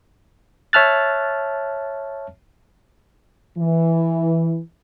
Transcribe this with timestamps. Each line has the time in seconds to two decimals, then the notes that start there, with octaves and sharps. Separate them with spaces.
0.73 C#5 E5 A5 F6 F#6 A6
3.58 E3